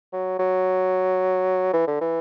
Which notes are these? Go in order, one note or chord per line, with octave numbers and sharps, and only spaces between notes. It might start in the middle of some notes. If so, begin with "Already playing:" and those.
F#3
F#3
E3
D3
E3